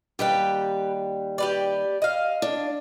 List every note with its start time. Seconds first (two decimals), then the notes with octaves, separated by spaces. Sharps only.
0.19 D#2 G3 G4 B4 G5
1.38 G4 B4 D5
2.02 D#5 F5
2.42 D4